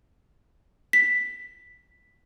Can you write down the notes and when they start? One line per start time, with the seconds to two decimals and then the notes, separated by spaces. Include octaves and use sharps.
0.93 B6